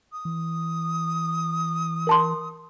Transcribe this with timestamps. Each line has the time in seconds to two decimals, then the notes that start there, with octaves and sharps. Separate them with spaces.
0.12 D#6
0.25 E3
2.07 A#4 A5 C6